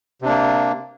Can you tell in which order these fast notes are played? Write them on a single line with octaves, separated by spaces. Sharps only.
C3 D4 A#3